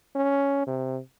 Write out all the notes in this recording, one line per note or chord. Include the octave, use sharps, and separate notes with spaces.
C#4
C3